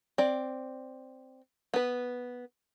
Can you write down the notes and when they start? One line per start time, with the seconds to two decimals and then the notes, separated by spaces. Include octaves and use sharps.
0.18 C4 D5
1.74 B3 B4